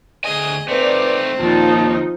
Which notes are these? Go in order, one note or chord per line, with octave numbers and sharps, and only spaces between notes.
D2 G#4 D#5 G#5
A3 C4 D#4 B4 D5
D#2 A#2 F3 D#4 A5